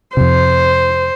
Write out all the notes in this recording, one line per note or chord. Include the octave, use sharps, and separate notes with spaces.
F2 C3 C5